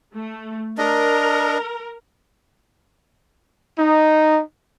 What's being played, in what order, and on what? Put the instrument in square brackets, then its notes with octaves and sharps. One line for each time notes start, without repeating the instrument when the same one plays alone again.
[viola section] A3
[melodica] D4 D#5 [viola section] A#4
[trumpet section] D#4